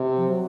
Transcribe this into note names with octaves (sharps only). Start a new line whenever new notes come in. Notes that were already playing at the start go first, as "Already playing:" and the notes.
Already playing: C3
F3
F#3